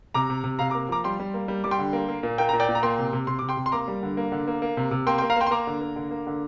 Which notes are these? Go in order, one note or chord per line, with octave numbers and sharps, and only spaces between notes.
C3 A#5 D6
C3
C3
C3 F5 A#5
A#5 D6
A#3
F3 A#5 D6
G3 G5 C6
G3
A#3
G3
G3 D6
G5 C6
D3
A#3
A#3
A#2
A#3 G5
A#2 A#5
D5 G5
A#2
A#5
A#3 G5 C6
C3
C3
C3 C6
C3 D6
G5 C6
C3
C6
A#3 A#5 D6
G3
D3
A#3
D3
A#3
A#3
C3
C3
A#3 G5 C6
G5 C6
A#3
F5 A#5
A#3 G5 C6
C6
A#3 A#5 D6
D3
A#3
D3
A#3
D3